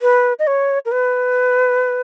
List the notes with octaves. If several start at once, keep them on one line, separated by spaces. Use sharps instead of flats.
B4
D#5
C#5
A#4
B4